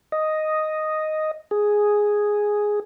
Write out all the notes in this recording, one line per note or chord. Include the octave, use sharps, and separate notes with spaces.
D#5
G#4